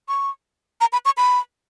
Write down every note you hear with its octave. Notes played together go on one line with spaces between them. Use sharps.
C#6
A#5
B5
C#6
B5